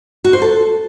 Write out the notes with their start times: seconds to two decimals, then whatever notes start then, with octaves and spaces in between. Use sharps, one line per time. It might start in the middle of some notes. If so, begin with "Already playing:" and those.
0.24 F#4
0.33 C5
0.42 A4